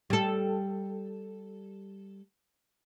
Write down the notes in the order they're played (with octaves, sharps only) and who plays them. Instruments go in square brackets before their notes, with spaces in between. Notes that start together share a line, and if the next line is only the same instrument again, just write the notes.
[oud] G3 A4